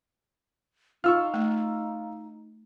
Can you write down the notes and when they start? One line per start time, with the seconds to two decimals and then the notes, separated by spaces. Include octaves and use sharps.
1.04 D#4 F4 C#6 E6 F6
1.34 A3